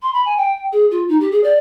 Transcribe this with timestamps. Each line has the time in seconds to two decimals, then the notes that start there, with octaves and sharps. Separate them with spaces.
0.02 C6
0.13 B5
0.26 G#5
0.37 G5
0.72 G#4
0.91 F4
1.09 D#4
1.21 G4
1.32 G#4
1.44 D5